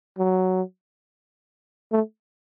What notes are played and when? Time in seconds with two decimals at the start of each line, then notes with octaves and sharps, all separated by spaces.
0.18 F#3
1.92 A3